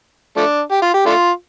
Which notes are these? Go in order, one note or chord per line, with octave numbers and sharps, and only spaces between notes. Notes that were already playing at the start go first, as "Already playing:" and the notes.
F3 A3 D4
G4
F4
G4
A3 D4 F4